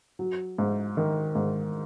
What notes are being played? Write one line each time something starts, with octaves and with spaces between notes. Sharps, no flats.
F#3
G#2
D#3
G#2